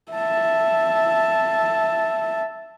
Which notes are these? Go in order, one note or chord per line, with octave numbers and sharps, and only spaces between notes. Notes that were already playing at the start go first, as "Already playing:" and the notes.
E5 A5